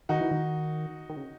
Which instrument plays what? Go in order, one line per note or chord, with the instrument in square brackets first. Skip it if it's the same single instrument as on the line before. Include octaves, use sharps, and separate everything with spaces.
[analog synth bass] D#3 [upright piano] D#4 F#4
[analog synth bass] E3
D#3
D#3
C#3